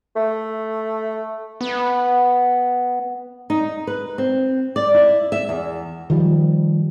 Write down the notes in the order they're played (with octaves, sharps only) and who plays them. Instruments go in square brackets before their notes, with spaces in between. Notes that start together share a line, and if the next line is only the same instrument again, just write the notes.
[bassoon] A3
[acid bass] B3
[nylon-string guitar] D#4
B4
C4
D5
E4
E5
E2
[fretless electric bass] D#3 F3 G3